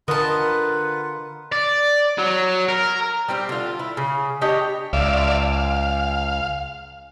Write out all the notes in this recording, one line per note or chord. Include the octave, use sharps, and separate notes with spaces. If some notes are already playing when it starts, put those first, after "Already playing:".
D3 F4 A#4 B4 D#5 F#5 A5
D5
F#3
A#4
G3 C4 G4
D3 F4
E4
C#3
D4 G4 C#5 D#5
C#2 D5 E5 F5
F5